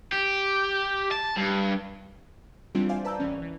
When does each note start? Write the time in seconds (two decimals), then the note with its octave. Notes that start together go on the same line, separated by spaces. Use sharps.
0.12 G4
1.11 A5
1.37 G2
2.75 E3 G3 C4 D4 F4
2.89 C5 D5 E5 F5 G#5
3.04 B4 D5 A5 A#5 E6 G6
3.19 G#1 E3 C#4
3.42 E3